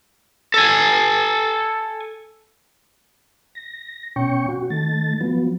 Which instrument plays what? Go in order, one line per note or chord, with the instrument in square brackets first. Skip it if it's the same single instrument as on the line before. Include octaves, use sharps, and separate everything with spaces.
[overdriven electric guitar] A4 G#5
[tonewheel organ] A#6
B2 C#4 G5 C#6
F#4
D#3 A3 A6
F3 F#3 B3